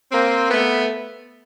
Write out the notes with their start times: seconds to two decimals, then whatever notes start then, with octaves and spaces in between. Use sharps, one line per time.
0.10 A#3 C4
0.50 A3 B3